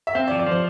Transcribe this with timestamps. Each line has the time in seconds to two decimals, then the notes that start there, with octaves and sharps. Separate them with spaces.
0.07 E5
0.15 C4 F5
0.27 D5
0.31 F3
0.39 D5
0.46 F3 C5